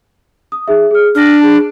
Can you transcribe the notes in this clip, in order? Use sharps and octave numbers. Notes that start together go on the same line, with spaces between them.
D#6
D#4 G#4 E5
G#4 F6
D4 F6 A#6
G#4 A5